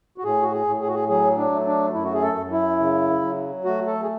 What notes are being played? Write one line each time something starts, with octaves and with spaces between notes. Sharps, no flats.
F#4
A2 G#4
F#4
G#4
A2
G#4
F#4
G#4
F#3 G#4
D4
A3
D4
F#2 E4
F#4
G#4
A4
F#2
E4
C#3
F#3
A3 F#4
A4
G#4